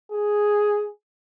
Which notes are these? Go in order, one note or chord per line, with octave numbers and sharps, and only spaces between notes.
G#4